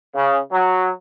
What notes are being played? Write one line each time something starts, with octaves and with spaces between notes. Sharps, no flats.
C#3
F#3